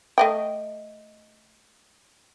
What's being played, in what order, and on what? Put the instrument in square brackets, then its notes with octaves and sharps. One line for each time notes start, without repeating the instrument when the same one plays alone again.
[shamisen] A3 D#5 G5